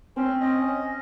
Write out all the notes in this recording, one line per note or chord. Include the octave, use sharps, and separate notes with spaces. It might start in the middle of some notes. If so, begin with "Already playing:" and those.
C4 C#4
D#5
C#4